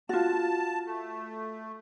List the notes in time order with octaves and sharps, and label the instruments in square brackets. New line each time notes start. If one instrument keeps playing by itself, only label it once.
[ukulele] F4 F#4 [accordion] A5
[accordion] A3